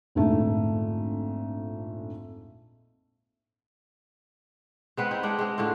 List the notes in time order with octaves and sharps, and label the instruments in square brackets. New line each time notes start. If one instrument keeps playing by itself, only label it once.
[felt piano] A#1 F2 G#2 D3 A3
[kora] G#3 B3 C4 B4
C4 D#4 E4
G#3 D4 F#5 G5
G#3 C4
A2 D3 C4 F4